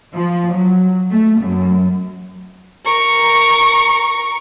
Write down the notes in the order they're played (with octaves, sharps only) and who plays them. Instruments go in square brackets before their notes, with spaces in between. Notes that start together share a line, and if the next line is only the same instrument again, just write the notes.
[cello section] F3
F#3
A3
F#2
[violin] A#4 C#6